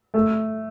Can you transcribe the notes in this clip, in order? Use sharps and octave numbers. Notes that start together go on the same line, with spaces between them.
A3